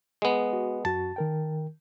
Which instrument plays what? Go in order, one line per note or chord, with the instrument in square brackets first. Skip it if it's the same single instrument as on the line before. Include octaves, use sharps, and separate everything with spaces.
[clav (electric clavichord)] G#3 B3
[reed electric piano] F#4
[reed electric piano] F#2 F#4 [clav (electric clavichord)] A5
[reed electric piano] D#3 A#4 G5